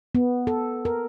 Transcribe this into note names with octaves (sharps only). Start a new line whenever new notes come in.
B3
A4
A#4